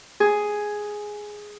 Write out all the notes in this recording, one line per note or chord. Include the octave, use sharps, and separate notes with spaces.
G#4